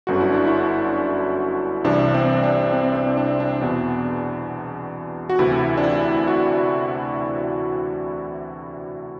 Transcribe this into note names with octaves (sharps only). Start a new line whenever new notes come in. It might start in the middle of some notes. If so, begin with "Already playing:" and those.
G1 F#2 D3 F#4
E4
D4
E4
C2 C3 E3 D4
C4
D4
C4
C4
D4
D4
E2 B2
F#4
D2 C3 E3 E4
D4
E4
F#4